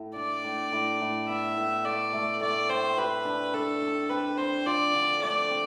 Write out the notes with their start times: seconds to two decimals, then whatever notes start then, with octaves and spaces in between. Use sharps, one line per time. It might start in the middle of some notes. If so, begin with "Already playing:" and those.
Already playing: A2
0.16 D4 D5
0.44 A2
0.73 A2
1.01 A2
1.28 B3 E5
1.57 A2
1.85 A3 D5
2.13 A3
2.41 A3 D5
2.69 C4 C5
2.98 G4 B4
3.25 D4
3.53 D4 A4
3.82 D4
4.09 C4 B4
4.38 C4 C5
4.66 F3 D5
4.94 D3
5.22 A3 D5
5.51 C4